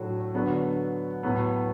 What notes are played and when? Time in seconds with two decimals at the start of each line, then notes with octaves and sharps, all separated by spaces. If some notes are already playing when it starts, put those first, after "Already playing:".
Already playing: A2 F#3 A3 D4 F#4
0.34 D3 F#3 B3 D4
1.23 A2 F#3 B3